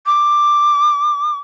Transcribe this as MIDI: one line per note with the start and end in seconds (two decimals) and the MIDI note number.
0.06 1.38 86